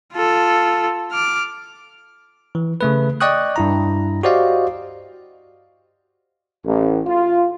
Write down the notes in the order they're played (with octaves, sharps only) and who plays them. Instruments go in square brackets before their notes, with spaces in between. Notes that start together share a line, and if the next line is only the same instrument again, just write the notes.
[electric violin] F4 A4
D6 F6
[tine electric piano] E3
C#3 A3 B4
D5 D#5 G5 C#6 D#6 F#6
G2 E4 A#5
F#4 G4 C5 D5 D#5 F5
[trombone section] A1
F4